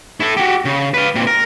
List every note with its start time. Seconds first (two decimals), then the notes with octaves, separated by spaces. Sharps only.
0.20 E4 A4
0.37 F#4 G4
0.65 C#3
0.94 B4 F5
1.15 A#2 C4
1.27 A#4